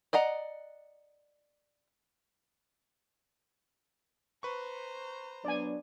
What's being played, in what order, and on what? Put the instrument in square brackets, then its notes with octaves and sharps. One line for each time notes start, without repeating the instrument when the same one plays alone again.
[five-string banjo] D5 D#5 F#5 A#5
[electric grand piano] B4 C#6 [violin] C5 A#5
[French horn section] F#3 B3 D4 [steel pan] D5 G#5